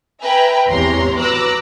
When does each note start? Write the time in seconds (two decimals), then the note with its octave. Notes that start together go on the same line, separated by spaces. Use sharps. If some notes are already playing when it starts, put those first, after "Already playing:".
0.22 B4 E5 G5 G#5 A#5
0.69 G#1 E2 C3 C#5 A#5 C6
1.18 F#4 B4 A#5 D6 E6 F#6